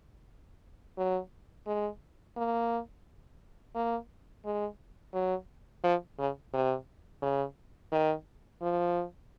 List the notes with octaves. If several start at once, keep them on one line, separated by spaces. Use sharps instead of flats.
F#3
G#3
A#3
A#3
G#3
F#3
F3
C#3
C3
C#3
D#3
F3